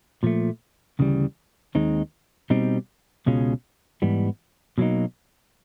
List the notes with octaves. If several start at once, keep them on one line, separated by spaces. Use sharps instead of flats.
A#2 F3 A3
D2 C#3 E3 G3
D#2 D#3 G#3 C4 D#4
B2 G3 C4 D#4
C#2 B2 G#3 C#4 F4
G#2 E3 G3 B3
B2 F#3 A#3 D#4